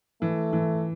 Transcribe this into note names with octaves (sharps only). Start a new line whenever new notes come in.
E3 A3
E3